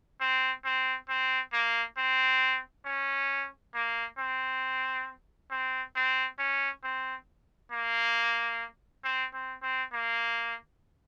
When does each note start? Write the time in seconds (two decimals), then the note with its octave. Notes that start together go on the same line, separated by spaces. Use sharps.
0.21 C4
0.65 C4
1.09 C4
1.53 A#3
1.98 C4
2.85 C#4
3.74 A#3
4.19 C4
5.51 C4
5.95 C4
6.39 C#4
6.84 C4
7.72 A#3
9.04 C4
9.33 C4
9.62 C4
9.93 A#3